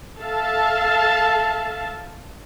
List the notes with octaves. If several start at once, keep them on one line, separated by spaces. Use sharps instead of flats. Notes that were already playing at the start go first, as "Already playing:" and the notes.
A4 E5 F5 A5